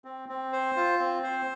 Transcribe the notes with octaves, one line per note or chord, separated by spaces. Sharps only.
C4
C4
C5
F4
C4
C5